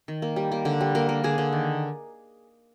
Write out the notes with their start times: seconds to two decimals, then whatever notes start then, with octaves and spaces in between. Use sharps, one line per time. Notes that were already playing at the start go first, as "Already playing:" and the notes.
0.08 D#3
0.22 A#3
0.36 G3
0.52 A#3
0.65 D3
0.81 G3
0.95 A#3 A#4
1.09 A#3
1.24 D3 G#4
1.38 D3
1.52 D#3